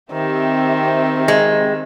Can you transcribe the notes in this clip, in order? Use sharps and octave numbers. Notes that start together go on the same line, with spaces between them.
D#3 C4 G4 E5
G#3